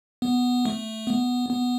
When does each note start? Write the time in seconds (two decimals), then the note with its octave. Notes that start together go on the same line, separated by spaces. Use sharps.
0.22 B3
0.65 A3
1.07 B3
1.50 B3